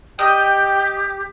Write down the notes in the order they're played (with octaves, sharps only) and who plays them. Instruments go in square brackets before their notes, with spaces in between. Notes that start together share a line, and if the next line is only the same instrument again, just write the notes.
[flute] G4 [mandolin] D#5 [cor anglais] G5